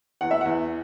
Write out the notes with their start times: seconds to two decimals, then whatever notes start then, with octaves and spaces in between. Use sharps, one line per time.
0.21 E2 F#5
0.31 E5
0.41 E2 F#5